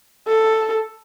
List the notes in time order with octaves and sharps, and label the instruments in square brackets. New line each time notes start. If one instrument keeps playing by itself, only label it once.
[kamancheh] A4